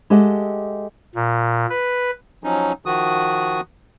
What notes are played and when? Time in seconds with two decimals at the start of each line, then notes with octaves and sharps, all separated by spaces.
0.10 G#3 G4 A4 D#5 E5 F#5
1.15 A#2
1.70 B4
2.44 F3 F#3 C#4 D#4
2.86 D#3 F3 F#4 D#6